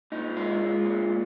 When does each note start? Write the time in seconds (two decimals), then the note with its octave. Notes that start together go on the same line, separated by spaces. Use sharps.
0.12 A#2 D#4
0.36 G#3 F4
0.61 G#3
0.85 A#2
1.09 A#2